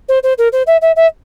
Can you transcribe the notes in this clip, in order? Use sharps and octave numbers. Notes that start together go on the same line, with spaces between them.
C5
C5
A#4
C5
E5
E5
E5